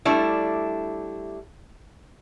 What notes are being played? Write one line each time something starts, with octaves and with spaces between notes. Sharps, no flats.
G3 A3 D4 E4